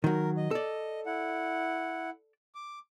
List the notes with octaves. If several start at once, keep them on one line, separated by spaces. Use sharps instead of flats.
D#3 F#3 A#4
D#5
A4 D5
E4 F#5
D6